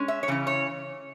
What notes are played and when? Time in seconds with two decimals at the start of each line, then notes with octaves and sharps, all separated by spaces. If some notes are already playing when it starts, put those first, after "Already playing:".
Already playing: G#3 C#4
0.08 E5
0.23 C#5
0.28 C#3 E3 C#4
0.47 C#5